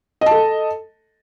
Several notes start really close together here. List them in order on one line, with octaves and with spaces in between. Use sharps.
D#5 A5 A4